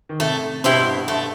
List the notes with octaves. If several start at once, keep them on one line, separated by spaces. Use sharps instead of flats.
D#3
A2 C3 A3
G2 B2 E4 G4 C5
G2 A3